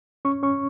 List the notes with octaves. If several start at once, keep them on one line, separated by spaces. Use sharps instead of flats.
C#4 C#6
C#4 C#6